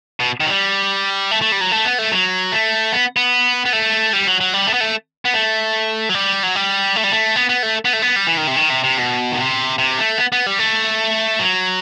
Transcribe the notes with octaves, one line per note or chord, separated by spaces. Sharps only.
B2
D#3
F#3
G3
A3
A3
G3
F#3
A3
B3
A3
F#3
A3
B3
B3
B3
A3
G3
F#3
F#3
G3
A3
B3
A3
B3
A3
F#3
G3
F#3
G3
A3
G3
A3
B3
B3
A3
B3
A3
B3
G3
E3
D#3
C3
D#3
C3
C3
B2
D#3
C3
C3
A3
B3
B3
G3
A3
F#3